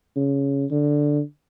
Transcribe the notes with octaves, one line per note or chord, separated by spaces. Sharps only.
C#3
D3